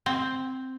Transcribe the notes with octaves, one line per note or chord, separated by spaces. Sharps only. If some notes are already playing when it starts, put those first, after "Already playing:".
C4